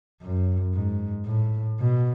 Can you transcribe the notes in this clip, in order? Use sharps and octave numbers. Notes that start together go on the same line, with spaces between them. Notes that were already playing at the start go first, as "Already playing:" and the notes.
F#2
G#2
A2
B2